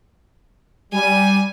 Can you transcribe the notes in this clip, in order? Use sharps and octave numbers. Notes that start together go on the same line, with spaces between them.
G3 G#5